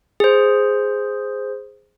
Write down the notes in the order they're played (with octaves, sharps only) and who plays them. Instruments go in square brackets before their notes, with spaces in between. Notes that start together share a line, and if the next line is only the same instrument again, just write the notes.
[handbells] G#4 C5